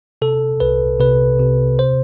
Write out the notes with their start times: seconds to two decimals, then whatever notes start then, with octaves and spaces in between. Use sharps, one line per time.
0.22 C3 A4
0.60 C2 B4
1.00 C3 B4
1.40 C3
1.79 C5